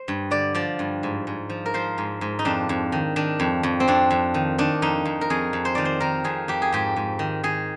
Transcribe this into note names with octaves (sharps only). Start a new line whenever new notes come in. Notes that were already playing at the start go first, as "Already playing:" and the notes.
Already playing: C5
G2
D3 D5
F3 D5
G2
G#2
G#2
F3
A#4
F3 C5
G#2
G#2
D#4
F2 D4
F2
D#3
D#3 D4
F2
F2
C4
F2 D4
F2
D#3
D#3 D4
F2 D#4
F2
A#4
F2 G#4
F2
C5
D#3 D5
C5
D#3 A#4
F2 G#4
F2 G4
G#4
G#2 G4
G#2
D#3
D#3 G#4